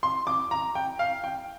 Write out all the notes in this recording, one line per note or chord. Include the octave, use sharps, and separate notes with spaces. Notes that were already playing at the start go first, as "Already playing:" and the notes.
C6
D6
A#5
G5
F5
G5